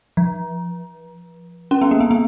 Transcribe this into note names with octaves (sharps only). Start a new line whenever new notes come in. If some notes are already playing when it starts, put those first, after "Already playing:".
F3
C#4
B3
A#3
B3
B3